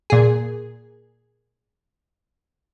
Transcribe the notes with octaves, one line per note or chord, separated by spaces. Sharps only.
A#2 G#4